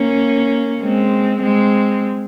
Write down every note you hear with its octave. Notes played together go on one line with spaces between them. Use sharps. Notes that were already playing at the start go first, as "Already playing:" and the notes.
Already playing: A#3 C#4
G#3 C4
G#3 C4